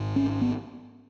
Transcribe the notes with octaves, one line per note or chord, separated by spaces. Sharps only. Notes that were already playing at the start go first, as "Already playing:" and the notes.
Already playing: G#1 G#2
C#4
B3